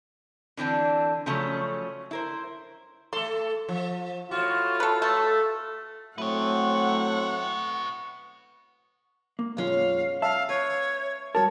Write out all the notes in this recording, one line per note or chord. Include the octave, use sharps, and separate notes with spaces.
D3 E3 C4 D4
C#3 F3 F#3 A3 C#4
E4 A#4 C5
A3 A4 C6
F3
A2 F4 F#4
A4 B4
A3 A4
A2 F#3 A3 C4 B4 C#5 F#5
A#3
B1 F#2 G#3 C#4 F4 F5
E5 F5 A5
B4 C#5
G3 F#4 A#4 C#5 A5